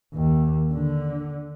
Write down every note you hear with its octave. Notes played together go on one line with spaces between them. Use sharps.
D#2
D3